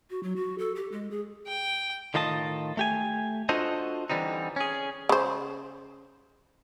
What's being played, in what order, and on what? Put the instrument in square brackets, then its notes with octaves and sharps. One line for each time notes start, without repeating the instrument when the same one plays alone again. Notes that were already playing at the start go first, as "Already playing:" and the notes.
[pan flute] F#4
F#3
F#4
A4
G4
G#3
G#4
[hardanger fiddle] G5
[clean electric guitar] A2 D#3 F4 D#5 A5
A3 G4 G#5
D4 F4 F#4 A4 C5 D#5
D3 E3 G3 C4 D#4
C#4 G#4
[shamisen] C#3 C5